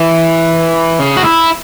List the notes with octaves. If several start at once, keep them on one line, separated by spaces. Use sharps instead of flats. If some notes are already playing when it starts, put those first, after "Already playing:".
Already playing: E3
C#3
F#4
E4